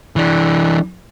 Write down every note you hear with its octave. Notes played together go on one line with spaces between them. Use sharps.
E3 D4